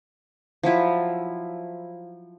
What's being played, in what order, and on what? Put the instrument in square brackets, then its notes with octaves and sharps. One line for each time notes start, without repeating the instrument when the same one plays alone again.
[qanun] F3 F#3 E4 F4